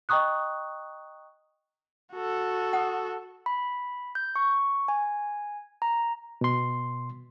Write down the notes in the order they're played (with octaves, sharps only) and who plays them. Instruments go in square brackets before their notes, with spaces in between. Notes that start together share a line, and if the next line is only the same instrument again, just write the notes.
[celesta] D#5 G5 A#5 C#6 D#6 F#6
[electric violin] F#4 A4
[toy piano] F#5 D#6
[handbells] B5
G6
C#6
G#5
A#5
[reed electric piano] B2 C6